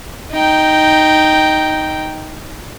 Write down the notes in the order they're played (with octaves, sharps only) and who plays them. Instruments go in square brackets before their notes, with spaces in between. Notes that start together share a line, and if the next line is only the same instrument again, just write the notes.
[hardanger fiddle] D#4 G5